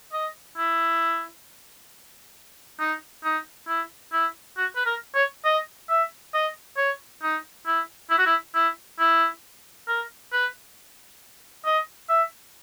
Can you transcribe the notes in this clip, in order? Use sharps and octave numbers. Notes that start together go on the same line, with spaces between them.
D#5
E4
D#4
D#4
E4
E4
F#4
B4
A#4
C#5
D#5
E5
D#5
C#5
D#4
E4
E4
F#4
E4
E4
E4
A#4
B4
D#5
E5